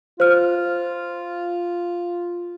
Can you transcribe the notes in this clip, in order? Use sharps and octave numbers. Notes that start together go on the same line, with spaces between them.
F4 C5 F6